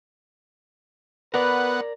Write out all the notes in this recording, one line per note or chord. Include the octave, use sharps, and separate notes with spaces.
B3 A#4 B4 D5 F#5